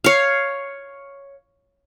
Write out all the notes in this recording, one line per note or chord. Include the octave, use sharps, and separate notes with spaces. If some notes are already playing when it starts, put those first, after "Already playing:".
C#5 F5